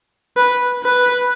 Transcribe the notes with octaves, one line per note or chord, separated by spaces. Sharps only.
B4
B4